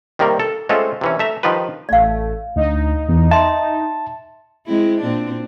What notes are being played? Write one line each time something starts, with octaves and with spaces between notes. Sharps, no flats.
C3 D#3 G3 A#3 A#4
A4
G#3 A3 C4 C#4 F4 A4
C3 E3 C#4
A3 E5 A#5
D#3 F3 D#4 F4 G4 B4
A1 A3 D5 F5
D2 D#4
E2
E5 A5 C6
G#3 C4 E4
A#2 C4 D4